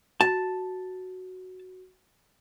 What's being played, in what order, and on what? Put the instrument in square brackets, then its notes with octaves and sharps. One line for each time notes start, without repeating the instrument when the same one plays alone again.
[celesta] F#4 [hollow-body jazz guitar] A5